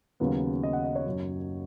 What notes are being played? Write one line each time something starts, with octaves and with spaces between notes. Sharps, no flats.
D#2 C#3 F#3 B3
D#5
F#5
D#5
C#5
F#1 F#2 F#3